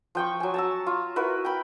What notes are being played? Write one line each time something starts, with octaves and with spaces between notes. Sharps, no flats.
F3 G5 C#6
F#3 G#5
A5 A#5 E6
F4
E4 F#4 A#4 B4
G5 B5